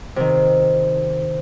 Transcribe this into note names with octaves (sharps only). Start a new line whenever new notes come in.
C3 D#3